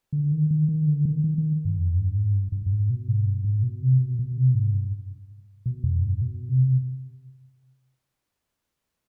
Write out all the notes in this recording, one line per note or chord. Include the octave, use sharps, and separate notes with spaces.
D3
D#3
D#3
D#3
D3
D#3
D#3
D#3
G2
F2
G2
G#2
G2
G2
G2
G#2
B2
G#2
G2
G#2
B2
C3
B2
B2
C3
B2
G#2
G2
B2
F2
G2
B2
C3